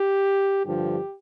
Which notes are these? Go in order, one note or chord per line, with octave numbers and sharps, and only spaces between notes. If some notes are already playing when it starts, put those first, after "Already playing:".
Already playing: G4
G2 D3 F3 G4